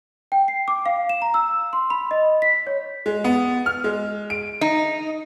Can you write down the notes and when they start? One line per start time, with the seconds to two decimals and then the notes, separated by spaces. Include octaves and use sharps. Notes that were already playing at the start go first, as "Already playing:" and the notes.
0.32 G5
0.48 C7
0.68 D6
0.86 F5
1.09 E7
1.22 A#5
1.34 E6
1.73 C6
1.90 B5
2.11 D#5
2.42 B6
2.67 C#5
3.06 G#3
3.24 B3
3.66 F6
3.84 G#3
4.30 D7
4.61 D#4